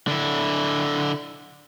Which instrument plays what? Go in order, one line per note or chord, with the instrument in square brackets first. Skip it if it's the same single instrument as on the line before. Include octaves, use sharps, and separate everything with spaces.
[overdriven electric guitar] D3 E4